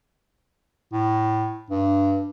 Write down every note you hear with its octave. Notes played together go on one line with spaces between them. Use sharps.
A2
G2